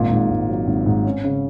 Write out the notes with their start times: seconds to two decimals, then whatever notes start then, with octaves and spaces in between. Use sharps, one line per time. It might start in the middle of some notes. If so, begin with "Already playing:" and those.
Already playing: G#1 A#2
0.11 G#2
0.30 G#1
0.49 F#3
0.67 G#1
0.86 G#2
1.05 C#4
1.24 C#3